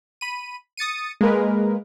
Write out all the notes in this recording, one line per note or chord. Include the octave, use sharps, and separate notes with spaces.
B5 D#7
D#6 A6 C#7 D#7
G#3 A#3 A#4 B4